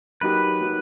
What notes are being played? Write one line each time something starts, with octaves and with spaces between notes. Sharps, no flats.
F#3 A#3 D#4 G4 B4
F#3 A#3 D#4 G4